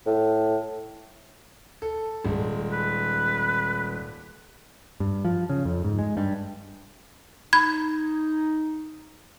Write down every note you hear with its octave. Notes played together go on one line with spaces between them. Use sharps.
A2
A4
D#1 G#3
B4
G2
F3
C#3
F2
G#2
G#3
G2
D#4 B5 G#6